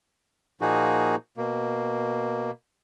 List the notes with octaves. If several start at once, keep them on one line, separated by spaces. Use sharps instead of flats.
A#2 F3 A#3 D#4 F#4 G#4
B2 A#3